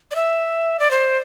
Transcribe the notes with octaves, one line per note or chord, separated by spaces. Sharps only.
D5
E5
D5
C5